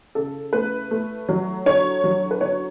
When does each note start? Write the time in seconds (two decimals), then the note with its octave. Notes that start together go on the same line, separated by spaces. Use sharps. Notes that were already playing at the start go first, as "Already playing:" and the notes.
0.15 C#3 A4
0.53 A3 B4
0.91 A3
1.29 F#3
1.66 D3 C#5
2.04 F#3
2.31 B4
2.41 D3 C#5